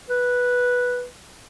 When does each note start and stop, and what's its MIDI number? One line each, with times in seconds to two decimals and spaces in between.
0.10 1.05 71